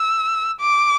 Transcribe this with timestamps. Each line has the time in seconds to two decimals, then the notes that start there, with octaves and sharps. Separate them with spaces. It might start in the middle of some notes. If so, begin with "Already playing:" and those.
Already playing: E6
0.60 D6